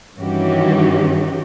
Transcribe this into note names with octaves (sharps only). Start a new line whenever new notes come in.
G2 D#3 E3 C#4 F#4 G4